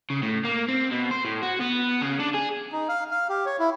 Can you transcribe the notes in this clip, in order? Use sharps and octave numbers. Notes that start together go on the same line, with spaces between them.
C#3
A2
A#3
C4
B2
C5
A2
F#4
B3
C#3
D4
G#4
D#4
F5
F5
G4
C#5
E4